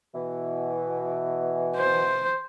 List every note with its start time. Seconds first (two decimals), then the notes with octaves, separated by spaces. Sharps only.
0.15 B2 E3
1.77 C5